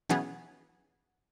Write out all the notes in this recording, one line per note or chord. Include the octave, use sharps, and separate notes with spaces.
B2 E3 F#3 B3 C#4 G#4